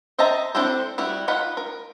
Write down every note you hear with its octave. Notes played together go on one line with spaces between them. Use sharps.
C5 D#5 E5 A5 A#5
C4 D4 E4 A4 C5
G3 E4 F#4
D#4 F4 F#5 B5
A#4